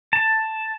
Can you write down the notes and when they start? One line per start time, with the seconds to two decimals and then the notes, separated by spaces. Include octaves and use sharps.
0.13 A5